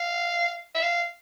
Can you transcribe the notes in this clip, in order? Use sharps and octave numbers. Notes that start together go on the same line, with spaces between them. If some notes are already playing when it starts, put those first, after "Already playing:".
Already playing: F5
E5
F5